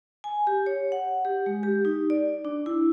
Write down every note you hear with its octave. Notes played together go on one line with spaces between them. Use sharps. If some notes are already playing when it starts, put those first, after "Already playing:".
G#5
G4
C#5
F#5
G4
G#3
G4
D#4
D5
D4
E4